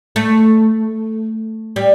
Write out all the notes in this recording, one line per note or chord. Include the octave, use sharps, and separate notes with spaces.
A3
G3